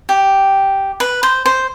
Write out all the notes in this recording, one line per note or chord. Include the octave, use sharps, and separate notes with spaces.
G4
B4
C5
C5